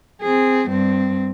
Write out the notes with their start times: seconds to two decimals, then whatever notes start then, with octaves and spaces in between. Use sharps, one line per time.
0.22 C4 G#4
0.69 G2 C4